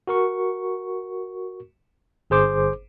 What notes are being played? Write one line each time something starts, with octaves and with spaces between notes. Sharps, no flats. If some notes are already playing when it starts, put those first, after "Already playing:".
F#4 A#4 C#6
G1 G#4 C5 D6